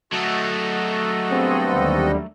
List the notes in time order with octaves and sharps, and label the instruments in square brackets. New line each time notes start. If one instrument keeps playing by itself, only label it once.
[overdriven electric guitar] F#3 A3 [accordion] F#4 A4 D#5
[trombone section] G2 B3 C4 [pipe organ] G#4
[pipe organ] D#2 D3 G3